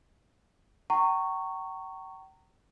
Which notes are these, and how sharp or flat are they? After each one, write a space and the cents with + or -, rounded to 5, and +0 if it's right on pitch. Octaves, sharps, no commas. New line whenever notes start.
G5 -40 A#5 -25 C#6 +0